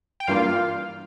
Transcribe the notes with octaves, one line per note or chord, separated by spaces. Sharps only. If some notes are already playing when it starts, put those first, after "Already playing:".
G5
G2 E3 G3 A#3 F4 F5